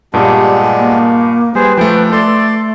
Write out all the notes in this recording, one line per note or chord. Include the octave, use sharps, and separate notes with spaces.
G2 A#2 G#3 B3 D4 G4
A#3
G3 G#4 B4 C5
F3 A3 G5
A3 A4 D5 C6